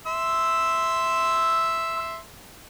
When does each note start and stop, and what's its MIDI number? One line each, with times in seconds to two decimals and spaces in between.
0.07 2.19 76
0.07 2.19 84
0.07 2.19 88